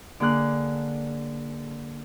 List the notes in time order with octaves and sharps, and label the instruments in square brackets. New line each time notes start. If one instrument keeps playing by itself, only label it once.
[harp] D3 A#3 G#4 F#6